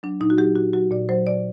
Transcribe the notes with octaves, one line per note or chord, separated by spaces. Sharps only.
F#3 D4
A#2 D#4
F#4
F#3 G4
A#2 F#4
F#3 F#4
A#2 D5
F#3 C5
A#2 D5